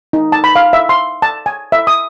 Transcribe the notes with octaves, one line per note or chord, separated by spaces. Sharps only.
D#4
A5
B5
F5
E5
C6
A5
G#5
E5
D#6